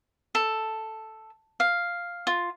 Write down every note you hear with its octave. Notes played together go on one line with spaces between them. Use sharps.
A4
F5
F4